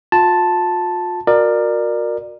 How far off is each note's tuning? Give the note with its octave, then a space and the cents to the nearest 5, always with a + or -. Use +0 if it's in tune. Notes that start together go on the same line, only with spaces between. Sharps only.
F4 +40 A5 +0 C6 +0
F#4 -25 A#4 +0 D5 +25